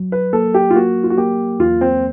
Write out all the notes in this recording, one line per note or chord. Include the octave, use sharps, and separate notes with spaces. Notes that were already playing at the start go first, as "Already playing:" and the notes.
Already playing: F#3
B4
A#3 A4
G4
F4
A#3 F#4
F4
F#4
A#3 G4
E2 F4
C4